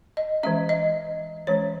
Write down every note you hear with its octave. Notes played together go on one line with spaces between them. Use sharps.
D#5
E3 G#3 C#4 E5
D#5
E3 G#3 C#4 C#5